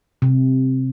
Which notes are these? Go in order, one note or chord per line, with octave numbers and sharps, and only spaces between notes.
C3